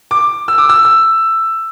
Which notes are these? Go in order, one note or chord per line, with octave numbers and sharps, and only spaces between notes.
D6
E6
D6
E6
E6